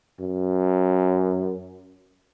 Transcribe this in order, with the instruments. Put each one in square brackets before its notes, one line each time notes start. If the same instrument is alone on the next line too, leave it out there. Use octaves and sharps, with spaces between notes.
[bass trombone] F#2